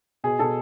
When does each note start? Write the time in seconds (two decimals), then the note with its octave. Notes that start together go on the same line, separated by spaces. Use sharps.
0.24 B2 G#4 G#5
0.39 B2 A4 A5